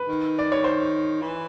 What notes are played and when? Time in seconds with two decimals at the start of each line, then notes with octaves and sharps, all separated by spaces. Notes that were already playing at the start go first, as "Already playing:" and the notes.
Already playing: B4
0.08 D#3
0.39 D5
0.52 C#5
0.64 C5
1.22 E3